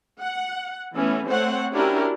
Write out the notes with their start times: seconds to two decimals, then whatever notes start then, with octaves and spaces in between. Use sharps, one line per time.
0.21 F#5
0.95 E3 A3 B3 C#4
1.27 A3 C4 C5 C#5 F#5
1.72 C#4 D4 E4 F#4 G4 A#4